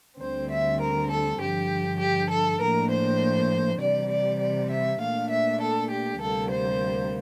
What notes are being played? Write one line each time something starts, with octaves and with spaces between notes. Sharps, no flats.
D2 D3 G3 C4 C5
E5
A#4
A4
G2 D3 F3 G4
G4
A4
A2 F3 A#3 D4 A#4
C5
C3 E3 G3 D5
D5
D5
E5
A#2 A3 D4 F5
E5
A4
G4
D2 C3 G3 A#3 A4
C5